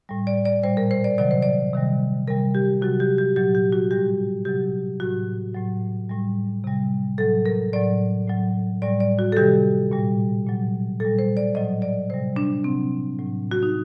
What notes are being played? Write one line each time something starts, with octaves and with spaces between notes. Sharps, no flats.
A2 G3
D5
D5
A#2 G3 C5
A#4
C5
D5
C3 D#3 F#3 D5
C5
D5
C3 D#3 G3
C3 G3 A#4
G4
C3 F#3 F#4
G4
G4
A#2 F#3 G4
G4
F#4
A2 G3 G4
C3 F#3 G4
A2 F#3 F#4
A2 F#3
A2 G3
C3 G3
A2 F#3 A4
A#4
A2 F#3 D5
A2 F#3
A2 G3 D5
D5
F#4
A4
C3 D#3 G3 G4
A#2 G3
A#2 F#3
A#2 G3 A4
C5
D5
A2 F#3 D#5
D5
C3 G3 C5
D4
C3 F#3 C4
A2 F#3
F#4
D#4